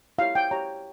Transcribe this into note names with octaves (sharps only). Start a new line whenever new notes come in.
E4 G4 C#5 F5
G5
G4 C#5 A#5